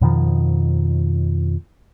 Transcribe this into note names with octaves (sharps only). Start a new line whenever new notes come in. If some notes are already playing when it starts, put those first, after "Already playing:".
F2 B2 D#3 F3